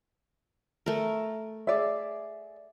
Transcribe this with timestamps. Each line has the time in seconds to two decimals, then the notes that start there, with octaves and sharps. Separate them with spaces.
0.86 A3 A#4
1.67 G#4 D5 E5